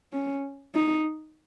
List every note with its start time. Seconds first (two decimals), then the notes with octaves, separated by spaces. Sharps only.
0.13 C#4
0.75 D#4